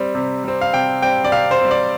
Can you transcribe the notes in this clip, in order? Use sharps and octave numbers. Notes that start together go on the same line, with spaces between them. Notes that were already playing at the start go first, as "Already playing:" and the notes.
Already playing: G3 C4
C3
G3 C4
F5
C3 G5
G3 C4 G5
D5
C3 F5
C5
G3 C4
D5